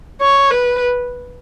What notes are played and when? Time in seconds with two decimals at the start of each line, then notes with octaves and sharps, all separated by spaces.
0.21 C#5
0.50 B4